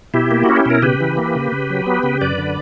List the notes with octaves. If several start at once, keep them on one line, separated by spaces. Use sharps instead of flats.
B2 E4 G4
A#3
C#4 F#4
G4
B2 A#4
C#3 G4 B4
E3
A#3
C#3
C#3
F#3
B3
C#3
F#2 B4 D5
D3